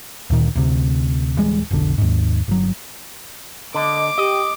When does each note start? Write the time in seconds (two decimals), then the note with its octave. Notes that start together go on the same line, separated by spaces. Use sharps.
0.30 D2 A#2 D#3
0.55 D2 C3
1.38 D1 E3 G3 G#3
1.71 F1 B1 D3
1.98 D#2 G#2
2.48 G1 F#3
3.75 D3 D#5 D6
4.18 G4 D#5